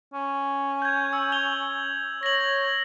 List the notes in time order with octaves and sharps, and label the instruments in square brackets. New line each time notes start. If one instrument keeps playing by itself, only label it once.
[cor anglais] C#4
[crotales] G6 G#6
E6
G#6 F7 G7
[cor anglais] C#5 [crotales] A#6 F#7